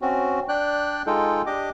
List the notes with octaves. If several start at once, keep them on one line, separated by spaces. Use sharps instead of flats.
C4 C#4 F#4
D4 D5 G5 F#6
G#3 D#4 F4 A4 G5
D4 G4 D#5 D6